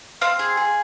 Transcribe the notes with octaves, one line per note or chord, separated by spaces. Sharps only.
C4 F5
G#4
G#4